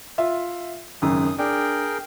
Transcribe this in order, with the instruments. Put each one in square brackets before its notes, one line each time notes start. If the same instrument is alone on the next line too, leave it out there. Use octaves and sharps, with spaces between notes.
[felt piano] F4 E5
[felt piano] G#1 F#2 C#3 [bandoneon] D#6
[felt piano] D4 [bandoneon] G#4 A#4 G5